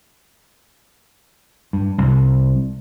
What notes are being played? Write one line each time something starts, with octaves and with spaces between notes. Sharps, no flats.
G2
C2